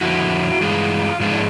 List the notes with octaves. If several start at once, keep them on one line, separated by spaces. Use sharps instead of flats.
F2 D3 F3 A3 E4 F#4
G2 E3 G#3 F4
G#2 F3 G#3 F4
D#4
D4 E4